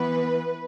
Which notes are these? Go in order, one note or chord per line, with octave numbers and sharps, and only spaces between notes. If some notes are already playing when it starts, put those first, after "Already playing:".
Already playing: E3 B3 B4